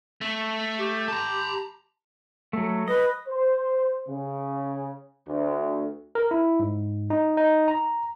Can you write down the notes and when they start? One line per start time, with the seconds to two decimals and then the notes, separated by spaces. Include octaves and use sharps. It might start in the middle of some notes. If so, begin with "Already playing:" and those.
0.21 A3
0.79 G4
1.08 A5 A#5
2.53 F#3 A3
2.88 B4 D#5
3.28 C5
4.09 C#3
5.28 D2
6.15 A#4
6.31 E4
6.60 G#2
7.10 D#4
7.37 D#4
7.68 A#5